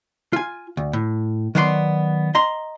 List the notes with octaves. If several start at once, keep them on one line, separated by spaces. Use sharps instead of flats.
F4 G#5
D2
A2
D#3 F#3 B3 D5 E5 C6
D#5 A#5 C6